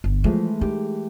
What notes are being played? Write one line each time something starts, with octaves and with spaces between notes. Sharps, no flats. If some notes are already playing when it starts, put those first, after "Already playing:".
G1
E3 F3 G#3 A3
D#4 G4